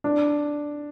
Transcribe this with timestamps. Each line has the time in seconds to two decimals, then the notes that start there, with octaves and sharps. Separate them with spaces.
0.04 D4